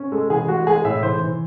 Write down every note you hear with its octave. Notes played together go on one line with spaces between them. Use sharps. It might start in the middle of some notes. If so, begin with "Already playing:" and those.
Already playing: C#4
G#3 A4
E3 G#4
G#3 F#4
G#3 G#4
A2 E5
E3 C5
E3